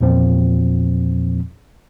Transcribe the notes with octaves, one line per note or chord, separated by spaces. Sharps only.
E2 A#2 F3 C4